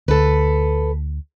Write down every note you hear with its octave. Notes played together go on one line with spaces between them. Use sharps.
D2 A4 B4